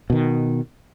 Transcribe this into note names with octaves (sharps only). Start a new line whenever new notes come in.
B2 D#3